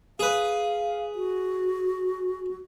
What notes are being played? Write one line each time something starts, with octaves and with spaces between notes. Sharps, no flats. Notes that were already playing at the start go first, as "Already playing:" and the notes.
G#4 B4 F5
F#4